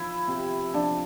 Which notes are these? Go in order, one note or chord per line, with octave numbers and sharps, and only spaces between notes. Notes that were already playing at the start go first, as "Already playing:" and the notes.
Already playing: F3 E4
C3
F3 D4